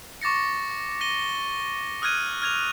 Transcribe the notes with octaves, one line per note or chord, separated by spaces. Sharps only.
C#6 D6 A6 A#6 C#7
A#6 D#7 G7
D#6 F6 F#6 G#6 D#7
F6 G#6 F7